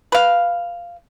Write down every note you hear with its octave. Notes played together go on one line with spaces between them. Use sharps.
B4 F5